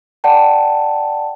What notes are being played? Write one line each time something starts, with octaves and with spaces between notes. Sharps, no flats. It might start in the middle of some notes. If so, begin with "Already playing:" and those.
D5 F#5 G5 A5